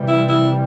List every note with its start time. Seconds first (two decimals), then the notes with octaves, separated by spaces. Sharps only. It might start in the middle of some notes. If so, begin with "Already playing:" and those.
Already playing: C3 E3 G3
0.08 E4
0.29 E4